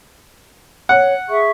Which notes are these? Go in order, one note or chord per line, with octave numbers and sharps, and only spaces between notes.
C#5 F#5
G#4 E5 C#6